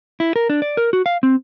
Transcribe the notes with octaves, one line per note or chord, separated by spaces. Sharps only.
E4
A#4
D4
D5
A#4
F#4
F5
C4